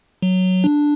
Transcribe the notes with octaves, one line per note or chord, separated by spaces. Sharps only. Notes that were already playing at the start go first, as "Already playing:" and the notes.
F#3
D4